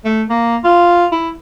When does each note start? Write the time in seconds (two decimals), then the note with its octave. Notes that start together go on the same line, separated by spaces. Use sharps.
0.05 A3
0.30 A#3
0.64 F4
1.12 E4